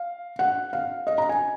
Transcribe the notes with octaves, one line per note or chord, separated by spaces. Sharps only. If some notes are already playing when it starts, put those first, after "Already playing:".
Already playing: F5
F#5
F5
D#5
A#5
G#5